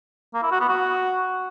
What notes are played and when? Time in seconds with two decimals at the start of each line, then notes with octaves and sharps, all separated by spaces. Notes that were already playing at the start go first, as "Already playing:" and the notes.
0.34 A#3
0.43 E4
0.51 F#4
0.60 B3
0.69 F#4